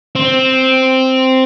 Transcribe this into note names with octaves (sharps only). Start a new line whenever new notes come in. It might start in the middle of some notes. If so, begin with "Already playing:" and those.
C4